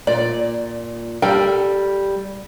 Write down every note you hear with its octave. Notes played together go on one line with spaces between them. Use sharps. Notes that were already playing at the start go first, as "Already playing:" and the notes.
A#2 D5
G3 A4 A#4 G5